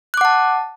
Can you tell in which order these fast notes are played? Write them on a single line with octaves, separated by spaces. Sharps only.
F#6 D6 F#5 A5